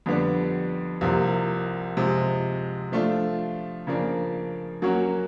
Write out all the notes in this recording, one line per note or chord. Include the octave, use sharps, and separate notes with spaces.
F2 D3 G3 B3 D4
C2 C3 F3 A#3
C3 F3 G#3 C4
F3 A3 D4 F4
C#3 F3 A#3 D4
F#3 A#3 C#4 F#4